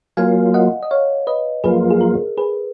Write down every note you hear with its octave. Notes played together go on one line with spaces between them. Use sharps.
F#3 A#3 F4 F5 G#5
D#5 F#5
D#5
C#5 F5
B4 D#5
F#2 F3 A#3 F4 G#4 B4
G#4
A#4
G#4 B4